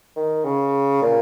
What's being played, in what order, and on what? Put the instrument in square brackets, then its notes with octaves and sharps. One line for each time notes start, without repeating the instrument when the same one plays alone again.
[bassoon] D#3
C#3
A#2